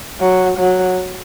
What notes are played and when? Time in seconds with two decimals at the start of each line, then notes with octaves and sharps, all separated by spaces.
0.20 F#3
0.58 F#3